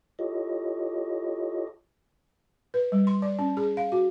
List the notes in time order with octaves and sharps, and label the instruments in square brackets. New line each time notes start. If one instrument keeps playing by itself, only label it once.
[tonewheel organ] E4 F4 G4 A4 C#5 D#5
[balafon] B4
G3
C6
D5
C#4
G#4
F5
F#4